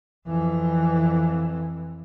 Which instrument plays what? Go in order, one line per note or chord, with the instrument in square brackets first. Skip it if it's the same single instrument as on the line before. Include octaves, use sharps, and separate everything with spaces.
[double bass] F2 E3